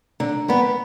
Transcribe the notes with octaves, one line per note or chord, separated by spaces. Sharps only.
D3 A#5
G3 B3 B5